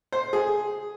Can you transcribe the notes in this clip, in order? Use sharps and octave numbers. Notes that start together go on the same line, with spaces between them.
C5
G#4